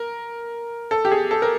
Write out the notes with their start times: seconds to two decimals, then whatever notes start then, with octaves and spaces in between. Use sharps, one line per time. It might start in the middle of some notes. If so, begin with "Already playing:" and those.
Already playing: A#4
0.91 A4
1.05 G4
1.12 G#4
1.31 A4
1.42 A#4